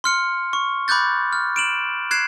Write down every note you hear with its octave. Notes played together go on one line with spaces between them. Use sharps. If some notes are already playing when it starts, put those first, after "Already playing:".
C6 F6 C#7
C#6
B5 D6 F#6 G6 A6
F6
D7 E7 F#7
F#6 G#6 C7 E7